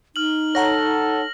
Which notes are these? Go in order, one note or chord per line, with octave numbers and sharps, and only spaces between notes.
D#4 F6 F#7
A4 C#5 F#5 A#5 A#6